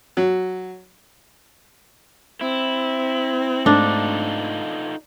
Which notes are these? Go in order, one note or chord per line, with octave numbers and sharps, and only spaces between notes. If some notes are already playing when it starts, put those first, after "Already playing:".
F#3
C4 E4
G#2 A3 D4 D#4 F4 A4